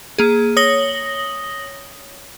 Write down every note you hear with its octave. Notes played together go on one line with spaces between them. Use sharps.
A#3 G#4
C#5 D#6 A#6 F#7 G7